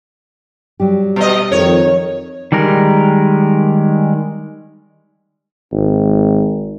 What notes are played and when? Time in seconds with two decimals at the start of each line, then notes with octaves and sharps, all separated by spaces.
0.80 F#3 G3 G4
1.16 B2 D#5
1.52 F2 D#3 C#5
2.52 D#3 G3 G#3 A#4
5.72 G#1